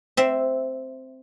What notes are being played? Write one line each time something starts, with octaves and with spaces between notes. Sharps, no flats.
C4 E5